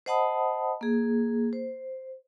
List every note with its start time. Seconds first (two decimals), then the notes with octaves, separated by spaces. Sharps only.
0.06 C5 D#5 F#5 A5 B5 D#6
0.81 A#3 G#4
1.53 C5